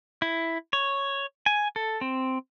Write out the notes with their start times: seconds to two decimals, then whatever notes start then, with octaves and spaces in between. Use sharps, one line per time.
0.22 E4
0.73 C#5
1.46 G#5
1.76 A4
2.01 C4